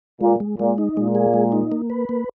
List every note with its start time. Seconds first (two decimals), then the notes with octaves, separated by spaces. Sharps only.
0.21 A#2 G#3
0.40 G#3
0.59 A#2 G#3
0.78 D#4
0.96 A#2 G#3
1.15 G#4
1.34 G#3
1.52 D#4
1.72 A#3
1.90 B4
2.09 A#3